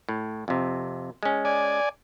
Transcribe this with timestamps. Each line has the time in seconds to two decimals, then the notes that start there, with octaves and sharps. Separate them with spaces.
0.09 A2
0.48 F2 C3
1.23 G#3 C#4
1.45 D5 G#5